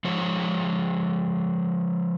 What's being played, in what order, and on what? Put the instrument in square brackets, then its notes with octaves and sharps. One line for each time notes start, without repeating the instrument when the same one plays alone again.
[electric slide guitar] F3 G#3 C#5